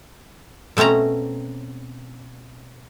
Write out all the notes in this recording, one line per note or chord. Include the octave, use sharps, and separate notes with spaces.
B2 A3 C4 C#4 A#5